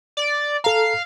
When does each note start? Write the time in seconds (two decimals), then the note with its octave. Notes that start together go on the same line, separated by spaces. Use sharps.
0.17 D5
0.64 A4 F5 A#5